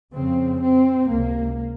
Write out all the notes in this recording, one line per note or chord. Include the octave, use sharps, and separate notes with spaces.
F2 C#3 C4
C4
C#2 C3 A#3